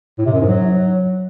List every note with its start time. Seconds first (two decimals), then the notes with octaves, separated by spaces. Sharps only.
0.18 A2
0.26 C3
0.33 F#2
0.41 G#2
0.48 F#3